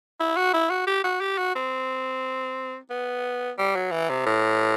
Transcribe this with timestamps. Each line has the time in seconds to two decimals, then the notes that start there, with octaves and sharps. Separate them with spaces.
0.20 E4
0.36 F#4
0.54 E4
0.70 F#4
0.87 G4
1.04 F#4
1.20 G4
1.38 F#4
1.55 C4
2.90 B3
3.58 G3
3.75 F#3
3.91 E3
4.09 C3
4.26 A2